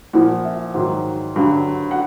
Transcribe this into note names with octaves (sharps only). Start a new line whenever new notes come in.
A#2 F3 F#5
E5
G#2 D#3 F#3
G2 D3 F#3
F#5